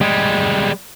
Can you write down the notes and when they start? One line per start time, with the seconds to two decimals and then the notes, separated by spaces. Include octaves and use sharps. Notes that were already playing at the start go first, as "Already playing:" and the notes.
0.01 G3 G#3